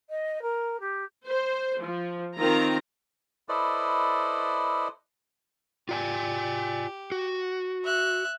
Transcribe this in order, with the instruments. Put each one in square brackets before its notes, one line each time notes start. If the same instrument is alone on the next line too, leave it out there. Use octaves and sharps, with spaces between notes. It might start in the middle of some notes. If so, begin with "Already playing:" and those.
[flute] D#5
A#4
G4
[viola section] C5
F3
D#3 C4 F4 A#5
[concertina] E4 A4 B4 C5 D5 D#5
[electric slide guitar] F4 D5 G#5 [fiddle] G4
[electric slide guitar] F#4
[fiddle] E5 F#6